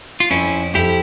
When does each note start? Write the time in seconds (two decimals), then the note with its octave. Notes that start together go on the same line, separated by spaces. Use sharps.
0.20 F4
0.31 F2 C#4 E4
0.75 F2 E4 G4